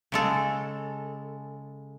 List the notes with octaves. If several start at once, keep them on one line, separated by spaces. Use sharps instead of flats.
C#3 G#3 A4